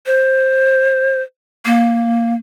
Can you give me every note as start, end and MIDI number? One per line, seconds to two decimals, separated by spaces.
0.06 1.21 72
1.65 2.34 58